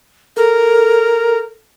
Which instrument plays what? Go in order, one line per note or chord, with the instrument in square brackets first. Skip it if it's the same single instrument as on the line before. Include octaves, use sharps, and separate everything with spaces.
[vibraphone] A4 [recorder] A#4